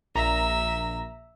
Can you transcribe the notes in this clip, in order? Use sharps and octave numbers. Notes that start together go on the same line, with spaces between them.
A#1 E5 A#5